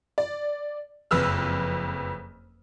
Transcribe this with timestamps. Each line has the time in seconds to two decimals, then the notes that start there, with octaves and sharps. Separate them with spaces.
0.18 D5
1.11 F#1 F2 B4 E6 F6